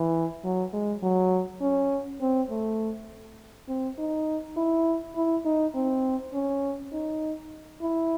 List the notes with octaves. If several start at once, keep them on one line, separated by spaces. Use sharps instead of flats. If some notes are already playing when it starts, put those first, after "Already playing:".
Already playing: E3
F#3
G#3
F#3
C#4
C4
A3
C4
D#4
E4
E4
D#4
C4
C#4
D#4
E4